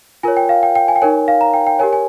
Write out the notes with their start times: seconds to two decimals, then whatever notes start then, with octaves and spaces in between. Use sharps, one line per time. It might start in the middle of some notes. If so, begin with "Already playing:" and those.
0.23 F4 A#4 C#5 G#5
0.37 G5
0.49 F5
0.63 G5
0.75 G5
0.88 G#5
0.96 G5
1.02 D#4 A#4 C#5 G#5
1.28 F5
1.41 A#5
1.54 G5
1.67 G5
1.79 G4 A#4 C#5 G#5
1.93 G#5